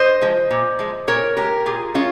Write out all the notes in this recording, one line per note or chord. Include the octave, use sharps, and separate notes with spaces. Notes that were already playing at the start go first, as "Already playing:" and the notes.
Already playing: C5 D#5
F3 G#3
A#2
F3 G#3
A#2 A#4 C#5
G#3 G4 A#4
A#2 F4 G#4
G#3 C#4 F4